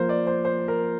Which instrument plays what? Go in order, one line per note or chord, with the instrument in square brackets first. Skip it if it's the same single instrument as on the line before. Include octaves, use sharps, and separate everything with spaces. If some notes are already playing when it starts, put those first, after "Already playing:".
Already playing: [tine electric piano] F3 A#3 F4 [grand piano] A#4 C5
[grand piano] D5
C5
C5
A#4